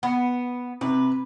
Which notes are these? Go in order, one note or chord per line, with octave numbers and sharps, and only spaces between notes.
B3
C3 B4